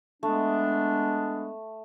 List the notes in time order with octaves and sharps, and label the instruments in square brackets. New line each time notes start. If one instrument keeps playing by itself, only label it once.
[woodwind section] G#3 B3 D4 [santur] A3